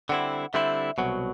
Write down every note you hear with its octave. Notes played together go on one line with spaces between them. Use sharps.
D3 G3 C4 E4 F#5
D3 G3 C4 E4 E5
C2 B2 F#3 F#5